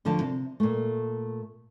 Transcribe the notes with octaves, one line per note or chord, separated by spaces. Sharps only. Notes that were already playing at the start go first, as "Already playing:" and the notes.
D2 D3 F3 A5
C3
A#2 A3